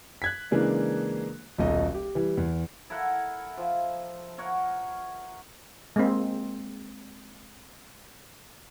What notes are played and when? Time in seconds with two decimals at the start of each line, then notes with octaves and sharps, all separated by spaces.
0.22 F#6 G#6 B6
0.51 C#3 E3 G#3 A#3 D4
1.58 D#1 B1 D#5
1.94 G4
2.15 E3 G3
2.37 E2
2.90 E4 A4 A#4 F#5
3.57 F3
4.38 A#4 C#5 F#5
5.96 G#3 A#3 C4